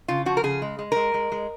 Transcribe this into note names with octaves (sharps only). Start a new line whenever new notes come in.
C#3 F4
F3 F#4
A#4
C#3 G#4
G#3
G#3
G#3 A#4
G#3
G#3